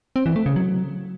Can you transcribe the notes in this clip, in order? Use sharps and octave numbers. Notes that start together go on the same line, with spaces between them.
C4
E3
A3
C#3
F#3